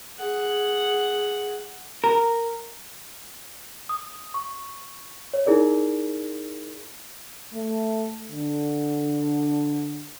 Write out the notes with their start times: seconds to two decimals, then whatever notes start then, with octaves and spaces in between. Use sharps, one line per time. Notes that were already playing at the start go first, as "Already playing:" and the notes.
0.19 G#4 F#5
2.04 A#4
3.89 D#6
4.34 C#6
5.34 C#5
5.46 D#4 E4 G#4 A#4 D5
7.53 A3
8.31 D3